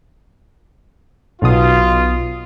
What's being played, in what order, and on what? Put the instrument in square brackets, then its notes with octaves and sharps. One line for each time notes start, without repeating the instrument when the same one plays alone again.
[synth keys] B1 B2 D#6 [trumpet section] F4